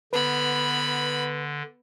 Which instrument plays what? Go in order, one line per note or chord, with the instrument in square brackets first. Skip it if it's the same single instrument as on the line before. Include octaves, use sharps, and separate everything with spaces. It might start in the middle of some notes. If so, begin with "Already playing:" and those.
[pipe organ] D3 [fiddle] B3 B5 [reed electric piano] B4